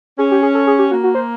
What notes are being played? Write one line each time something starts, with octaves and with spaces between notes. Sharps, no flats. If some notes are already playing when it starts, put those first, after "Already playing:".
C#4 G#4
G4
G#4
A4
G#4
G4
A#3 F#4
F#4
C5